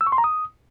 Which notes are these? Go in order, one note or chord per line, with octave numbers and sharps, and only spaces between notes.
E6
C#6
C6
A#5
D#6